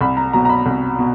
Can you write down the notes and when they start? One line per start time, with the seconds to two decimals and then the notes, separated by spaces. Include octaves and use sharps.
0.01 C2 B5
0.17 A#5
0.33 B2 F#3 A#5
0.45 A#5
0.49 B5
0.66 C2
0.98 B2